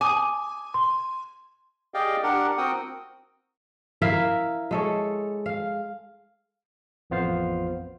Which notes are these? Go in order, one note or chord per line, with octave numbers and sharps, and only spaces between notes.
G#5 D6 D#6
C6
G4 G#4 D5 D#5 F5 G5
D4 G4 A#4 F#5
C4 F#4 A#4 F#5 G5 D#6
E4 A#4 E5 F5
G#3 A4 C#5
F5
A1 F2 B3 F4 C5 F5